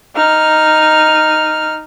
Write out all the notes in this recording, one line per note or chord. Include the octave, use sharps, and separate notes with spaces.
D#4 F6